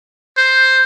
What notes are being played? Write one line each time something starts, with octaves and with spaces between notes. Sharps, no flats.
C5